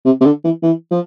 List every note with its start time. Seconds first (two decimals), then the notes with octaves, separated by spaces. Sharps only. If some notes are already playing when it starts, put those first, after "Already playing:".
0.05 C3
0.21 C3
0.25 D3
0.44 E3
0.63 E3
0.91 F3